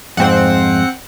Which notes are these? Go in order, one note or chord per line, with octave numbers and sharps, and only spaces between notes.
F2 G#2 C4 C5 F#5